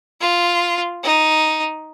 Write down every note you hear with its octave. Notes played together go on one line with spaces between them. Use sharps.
F4
D#4